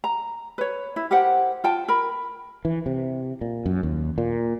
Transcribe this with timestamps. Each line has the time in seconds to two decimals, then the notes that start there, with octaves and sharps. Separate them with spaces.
0.04 A#5
0.58 B4 C#5
0.96 E4
1.11 G4 A#4 C5 F#5
1.64 F4 G5 A5
1.88 A#4 B5
2.65 E3
2.86 C3
3.41 A#2
3.66 F#2
3.83 D#2
4.18 A#2